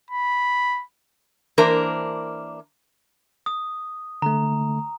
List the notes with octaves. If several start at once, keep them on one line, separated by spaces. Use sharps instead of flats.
B5
E3 A#3 D4 A#4 C5
D#6
D3 A3 A#5